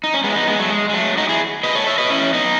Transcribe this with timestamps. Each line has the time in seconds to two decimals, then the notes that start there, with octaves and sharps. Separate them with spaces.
0.04 D#4
0.14 C#4
0.24 G#3 B3
0.30 E4
0.35 B3 D#4
0.47 G#3 B3
0.59 F#3 A3
0.70 G#3
0.89 G#3
0.93 F#3 A3
1.17 D#4 F#4
1.29 E4 G#4
1.63 B4 D#5
1.75 A4 C#5
1.87 C#5 E5
1.98 B4 D#5
2.10 C#4 E4
2.34 B3 D#4